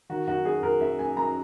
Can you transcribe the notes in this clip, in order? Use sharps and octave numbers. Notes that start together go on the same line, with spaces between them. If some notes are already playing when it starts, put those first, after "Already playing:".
D#3 F#4
F#2 F#4
F#2 G#4
F#2 A#4
F#2 E5
F#2 G#5
F#2 A#5